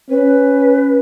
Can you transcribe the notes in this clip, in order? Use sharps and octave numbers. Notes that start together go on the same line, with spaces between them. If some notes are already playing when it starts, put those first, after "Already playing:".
C#4 B4